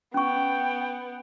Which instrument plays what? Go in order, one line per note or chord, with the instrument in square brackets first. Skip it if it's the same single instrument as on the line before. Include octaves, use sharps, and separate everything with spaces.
[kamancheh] B3 [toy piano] C#4 C#6 [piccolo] G5